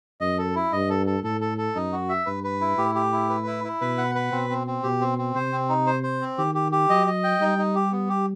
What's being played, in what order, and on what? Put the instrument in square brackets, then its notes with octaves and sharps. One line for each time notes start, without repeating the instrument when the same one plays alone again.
[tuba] F#2 [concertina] D#5
[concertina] A4
E4
[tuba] G2 [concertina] D#5
[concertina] A4
A4
[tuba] A2 [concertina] A4
[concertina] A4
A4
[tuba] F#2 [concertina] D#4
[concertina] F#4
E5
[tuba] G2 [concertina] B4
[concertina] B4
E4
[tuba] A2 [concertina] G4
[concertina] G4
E4
B4
E4
E4
[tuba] B2 [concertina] B4
[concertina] F#5
B4
[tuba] B2 [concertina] C4
[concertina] C4
C4
[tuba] B2 [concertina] G4
[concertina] C4
C4
[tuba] C3 [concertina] C5
[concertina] C4
D#4
C5
C5
C4
[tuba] D#3 [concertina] G4
[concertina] G4
G4
[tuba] F#3 [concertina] D#5
[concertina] D#5
G5
[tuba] G3 [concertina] D#4
[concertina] D#4
G4
B3
G4